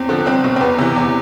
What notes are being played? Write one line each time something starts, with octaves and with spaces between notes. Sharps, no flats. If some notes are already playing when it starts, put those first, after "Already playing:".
Already playing: E2 C4
D3 F3
C2 C4
B2
C4
E2 B3
C3 E3
E2